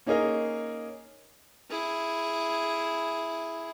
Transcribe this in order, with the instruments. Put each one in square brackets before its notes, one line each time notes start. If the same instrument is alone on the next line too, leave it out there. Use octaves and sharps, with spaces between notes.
[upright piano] A#3 C#4 D#4 G#4 A#4 D#5
[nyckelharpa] E4 G#4